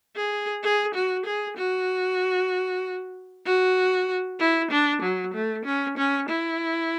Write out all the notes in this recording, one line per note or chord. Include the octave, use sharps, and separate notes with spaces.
G#4
G#4
F#4
G#4
F#4
F#4
E4
D4
F#3
A3
C#4
C#4
E4